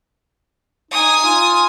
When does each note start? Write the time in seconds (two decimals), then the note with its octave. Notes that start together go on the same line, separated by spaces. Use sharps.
0.91 D#4 G#5 D#6
1.24 F4